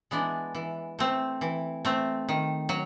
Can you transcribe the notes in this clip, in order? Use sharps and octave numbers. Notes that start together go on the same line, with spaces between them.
E3 G#3 B3 D4
E3
A3 C4
E3
A3 C4
D#3
F#3